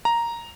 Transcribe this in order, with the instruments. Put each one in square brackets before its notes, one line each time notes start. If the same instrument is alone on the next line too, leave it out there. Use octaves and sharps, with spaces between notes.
[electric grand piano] A#5